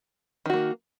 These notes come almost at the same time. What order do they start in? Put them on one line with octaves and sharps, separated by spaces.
D#3 F#4 A#3